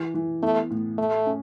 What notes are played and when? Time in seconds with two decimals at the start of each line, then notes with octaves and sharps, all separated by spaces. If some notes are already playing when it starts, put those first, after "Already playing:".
Already playing: E3
0.14 E3
0.42 A3 B3
0.70 A2
0.98 A2 A3
1.26 C#4